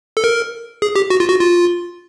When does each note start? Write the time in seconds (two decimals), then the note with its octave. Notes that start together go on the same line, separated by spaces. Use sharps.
0.17 A4
0.24 A#4
0.82 G#4
0.96 G4
1.10 F#4
1.20 F4
1.29 F#4
1.40 F4